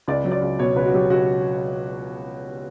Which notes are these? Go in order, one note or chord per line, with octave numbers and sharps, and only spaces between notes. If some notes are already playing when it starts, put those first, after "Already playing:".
C#2 D5
F#3
D5
C#2
B2 C#5
C#2 B4
F#4
F#3 G4
C#2 F#4